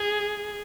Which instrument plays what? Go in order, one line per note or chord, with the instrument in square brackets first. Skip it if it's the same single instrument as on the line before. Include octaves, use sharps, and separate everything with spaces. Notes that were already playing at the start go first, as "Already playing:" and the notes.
Already playing: [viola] G#4